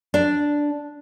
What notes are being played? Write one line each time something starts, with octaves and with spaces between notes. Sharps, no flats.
D4